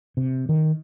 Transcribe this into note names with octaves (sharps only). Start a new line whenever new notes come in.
C3
D#3